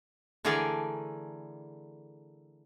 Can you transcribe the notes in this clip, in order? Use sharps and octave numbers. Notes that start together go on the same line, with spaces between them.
D3 E3 A3 G#4 A#4 D5